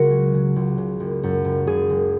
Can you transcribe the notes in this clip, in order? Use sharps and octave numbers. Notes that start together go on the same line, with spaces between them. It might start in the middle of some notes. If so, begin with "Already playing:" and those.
Already playing: C#2 C#3 F#3 F#4 A#4
C#4
C#3
C#2
C#3
F#1
F#2
F#1
C#3 G#4
F#1